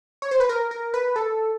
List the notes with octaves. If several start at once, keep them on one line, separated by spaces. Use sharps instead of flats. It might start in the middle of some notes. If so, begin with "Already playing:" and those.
C#5
C5
B4
A#4
A#4
B4
A4